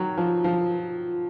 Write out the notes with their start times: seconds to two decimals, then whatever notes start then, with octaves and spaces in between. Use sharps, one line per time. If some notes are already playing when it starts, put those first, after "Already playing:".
Already playing: D#3 F#3
0.18 F3
0.44 F3